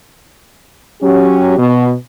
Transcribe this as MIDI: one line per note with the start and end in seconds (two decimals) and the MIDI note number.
1.01 1.55 54
1.01 1.55 61
1.01 1.55 67
1.57 1.92 47